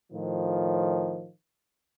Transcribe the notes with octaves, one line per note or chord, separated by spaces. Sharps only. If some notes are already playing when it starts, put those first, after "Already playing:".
A2 D#3 F3